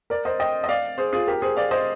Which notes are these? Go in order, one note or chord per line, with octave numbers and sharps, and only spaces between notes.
A#4 D5
C5 D#5
D#5 G5
D#5
D5 F5
G#4 C5
F4 G#4
G4 A#4
G#4 C5
D5 F5
C5 D#5